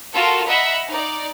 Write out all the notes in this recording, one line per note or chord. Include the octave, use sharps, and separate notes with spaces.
F4 F#4 A4 A#4 A5
D#5 E5 F#5 A#5 B5
D#4 D5